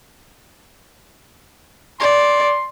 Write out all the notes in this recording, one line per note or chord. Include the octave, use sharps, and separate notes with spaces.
D5 C6